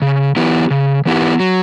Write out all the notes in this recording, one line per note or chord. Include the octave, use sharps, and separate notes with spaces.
C#3
E3 B3 E4 G4
C#3
E3 B3 E4 G4
F#3